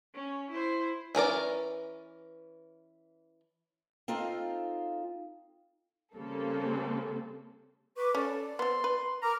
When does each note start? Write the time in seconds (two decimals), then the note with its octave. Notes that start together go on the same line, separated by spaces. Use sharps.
0.15 C#4
0.51 E4 C5
1.15 E3 C#4 A#4 D5
4.08 C4 D#4 F4 A4 F5
6.15 C#3 G3 A#3 C4 A4
7.97 B4 C#6 D6
8.15 C#4 A4 D5
8.59 B3 C4 C6
8.84 B4
9.22 A#4 A#5 D6 F6